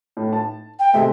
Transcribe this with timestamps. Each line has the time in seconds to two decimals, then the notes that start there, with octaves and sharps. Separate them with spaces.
0.17 A2
0.33 A5
0.79 G5
0.93 C3 G#3 A3 E5